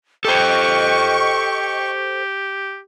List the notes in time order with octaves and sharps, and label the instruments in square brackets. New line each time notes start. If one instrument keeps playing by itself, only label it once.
[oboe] G4 [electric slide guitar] A4 C5 [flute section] D#5 G5 [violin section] C#6